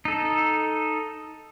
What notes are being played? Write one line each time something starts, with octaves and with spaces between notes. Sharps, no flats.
D#4 A4